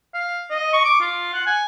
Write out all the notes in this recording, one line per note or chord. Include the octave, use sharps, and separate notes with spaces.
F5
D#5
C#6
D6
F4
F#5
G#5